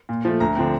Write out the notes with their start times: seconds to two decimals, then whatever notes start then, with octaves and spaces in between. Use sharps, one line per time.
0.09 A#2
0.25 F3 A3
0.40 D2 A#5
0.56 D3 F3 C4